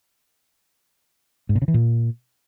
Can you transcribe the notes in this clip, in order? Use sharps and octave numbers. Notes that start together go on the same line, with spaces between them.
G#2
A#2
C#3
E3
A#2